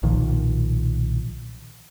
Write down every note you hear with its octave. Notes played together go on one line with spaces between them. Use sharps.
B1 A#2 D#3 F3